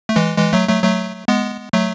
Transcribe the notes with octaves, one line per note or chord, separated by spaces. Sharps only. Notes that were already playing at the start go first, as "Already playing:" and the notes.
A3
E3 G#3
E3 G#3
F#3 A3
F#3 A3
F#3 A3
G#3 B3
F#3 A3